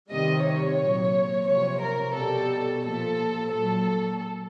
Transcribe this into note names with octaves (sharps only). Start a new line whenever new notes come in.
C3 D#3 G3 D#5
C#5
A#2 F#3
C3 F3 C#5
A#4
B2 G3 A4
A#2 F3 A4
A#2 F#3 A4